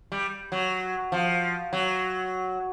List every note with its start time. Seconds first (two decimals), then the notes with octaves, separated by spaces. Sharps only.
0.12 G3
0.52 F#3
1.12 F3
1.73 F#3